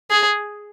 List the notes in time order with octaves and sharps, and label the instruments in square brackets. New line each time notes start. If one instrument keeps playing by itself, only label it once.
[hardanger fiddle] G#4